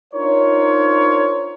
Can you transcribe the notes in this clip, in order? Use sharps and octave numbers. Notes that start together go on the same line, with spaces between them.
D4 D#4 F4 A#4 C5 C#5